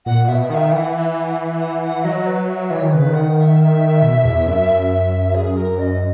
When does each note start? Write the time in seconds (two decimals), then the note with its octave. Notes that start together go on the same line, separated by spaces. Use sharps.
0.06 A#2 F#5
0.28 B2 E5
0.50 D#3 F#5
0.55 E5
0.72 E3 F#5 G#5
0.94 F#5
0.98 E5
1.16 G#5
1.21 F#5
1.60 F#5
1.82 F#5
2.04 F#3 D#5
2.27 B4
2.49 E5
2.70 E3 C#5 D#5
2.82 D#3
2.92 C#3 B4
3.07 D#3
3.14 F#5
3.37 F#5
3.41 E5
4.02 B2
4.25 E2
4.47 F#2
5.35 G#4
5.57 A#4
5.79 D#5